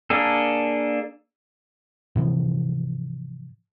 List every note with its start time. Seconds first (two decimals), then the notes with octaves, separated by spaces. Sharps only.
0.10 A#3 D4 G#4 A4
2.16 G#2 C3 E3 F3